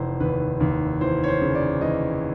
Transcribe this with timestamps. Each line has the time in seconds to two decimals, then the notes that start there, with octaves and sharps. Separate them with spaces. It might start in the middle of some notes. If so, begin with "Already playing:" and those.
Already playing: F1 E3 C5
0.20 D#2 B4
0.60 D#2
1.01 E3 C5
1.24 C#5
1.28 C5
1.41 C#3
1.55 D5
1.81 E3 D#5